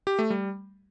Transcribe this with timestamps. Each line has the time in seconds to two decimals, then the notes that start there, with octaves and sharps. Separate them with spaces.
0.07 G4
0.19 A3
0.30 G3